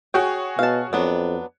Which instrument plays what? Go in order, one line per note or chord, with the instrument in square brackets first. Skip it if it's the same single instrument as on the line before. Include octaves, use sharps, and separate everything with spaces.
[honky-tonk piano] F#4 G#4 C#5 [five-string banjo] G5
[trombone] B2 [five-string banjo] F5 A5
[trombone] F2 [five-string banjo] F#3 B3 D4